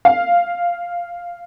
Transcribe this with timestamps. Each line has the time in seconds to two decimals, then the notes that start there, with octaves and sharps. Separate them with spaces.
0.05 F5